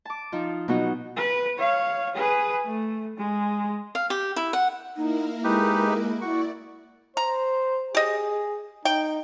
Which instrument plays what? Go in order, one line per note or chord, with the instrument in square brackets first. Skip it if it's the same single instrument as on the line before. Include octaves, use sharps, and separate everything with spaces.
[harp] A5 D6
F3 D#4
B2 F#3 B3 D#4 F#4
[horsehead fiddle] B4
C#5 F5
G#4 B4
A3
G#3
[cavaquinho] F5
G4
E4
F#5
[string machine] A#3 E4 A#4 [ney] D#4
[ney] G#3 [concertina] D#4 G4 B4
[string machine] E4 D5 [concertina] F#4 C#6
[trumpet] C5 [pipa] A#5
[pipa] G4 D#5 [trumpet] G#4
[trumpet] D#4 [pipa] G5